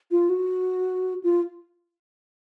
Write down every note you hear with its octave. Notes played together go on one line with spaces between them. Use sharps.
F4
F#4
F4